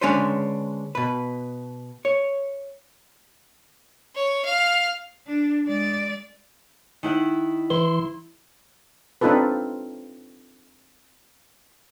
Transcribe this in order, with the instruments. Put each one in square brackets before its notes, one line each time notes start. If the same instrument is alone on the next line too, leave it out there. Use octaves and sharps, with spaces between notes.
[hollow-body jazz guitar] D3 G#3 C#4 D4 B4 C5
B2 B4
C#5
[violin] C#5
F5
[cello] D4
G#3 D5
[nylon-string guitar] D#3 E4 F#5
[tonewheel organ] E3 C6 [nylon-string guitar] E4
[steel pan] C4 D4 D#4 F4 A4 B4